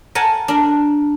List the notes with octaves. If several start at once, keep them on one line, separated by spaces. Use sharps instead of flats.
A#4 F#5 G#5 A5
D4 A#4